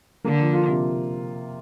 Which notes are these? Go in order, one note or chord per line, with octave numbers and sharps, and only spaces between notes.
D3 A#3
F3
F4
C3